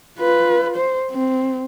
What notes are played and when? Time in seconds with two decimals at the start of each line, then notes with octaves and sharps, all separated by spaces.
0.19 F4 B4
0.76 C5
1.11 C4